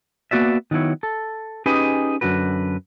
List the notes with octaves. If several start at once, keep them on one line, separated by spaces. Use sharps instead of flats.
A#3 B3 F#4 D5 E5
D#3 F#3 B3 E4 C#5
A4
C#4 D#4 G4 G#4 B4 D#5
F#2 B2 D3 F#4 B4